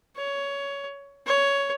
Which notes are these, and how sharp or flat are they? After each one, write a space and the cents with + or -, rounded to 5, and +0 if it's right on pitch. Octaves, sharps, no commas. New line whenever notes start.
C#5 +15
C#5 +10